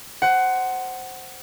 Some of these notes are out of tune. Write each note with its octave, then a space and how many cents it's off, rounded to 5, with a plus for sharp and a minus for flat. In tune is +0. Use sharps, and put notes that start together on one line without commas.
C5 +0 F#5 +15